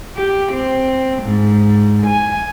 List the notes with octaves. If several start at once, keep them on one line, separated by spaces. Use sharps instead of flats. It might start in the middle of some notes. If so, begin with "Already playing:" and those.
G4
C4
G#2
G#5